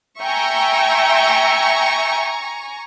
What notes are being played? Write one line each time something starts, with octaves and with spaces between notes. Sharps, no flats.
E5 G5 G#5 A#5 C#6